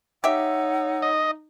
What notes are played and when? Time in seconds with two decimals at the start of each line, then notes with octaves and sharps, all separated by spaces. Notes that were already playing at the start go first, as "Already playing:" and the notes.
0.24 D#4 G4 C#5 E5 F#5 E6
1.02 D#5